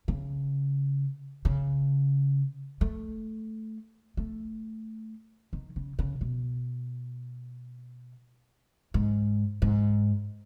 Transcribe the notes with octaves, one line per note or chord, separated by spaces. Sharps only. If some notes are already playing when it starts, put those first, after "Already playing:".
C#3
C#3
A3
A3
D#3
C#3
C#3
B2
G#2
G#2